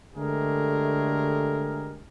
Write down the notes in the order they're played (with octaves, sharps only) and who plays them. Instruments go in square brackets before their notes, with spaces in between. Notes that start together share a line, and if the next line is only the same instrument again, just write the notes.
[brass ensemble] D3 G#3 A3 G4 G#4 A#4